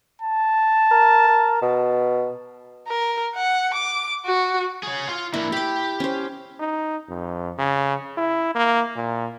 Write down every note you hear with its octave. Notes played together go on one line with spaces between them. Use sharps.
A5
A#4
A#4
B2
A#4
F#5
D6
F#4
G#4 C#5
F4 F5
A#3 D4 E4
G4 B5 D6
C#4 C5
D#4
F2
C#3
E4
A#3
A#2